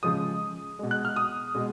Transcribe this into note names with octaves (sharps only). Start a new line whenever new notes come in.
C#3 F3 G#3 D#6
B2 G#3
F#6
F6
D#6
B2 G#3